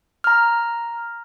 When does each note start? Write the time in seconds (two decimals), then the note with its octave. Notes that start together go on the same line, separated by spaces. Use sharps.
0.24 A#5 F6